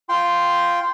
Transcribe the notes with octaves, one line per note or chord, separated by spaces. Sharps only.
F4 G5 C6